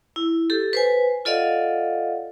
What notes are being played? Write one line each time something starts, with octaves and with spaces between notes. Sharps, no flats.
E4
G4 A4
B4 C5 G#5
F4 A4 D5 D#5 F5 F#5